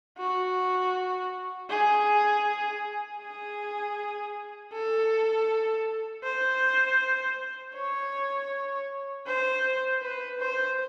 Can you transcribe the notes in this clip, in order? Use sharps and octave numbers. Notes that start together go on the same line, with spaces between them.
F#4
G#4
G#4
A4
C5
C#5
C5
B4
C5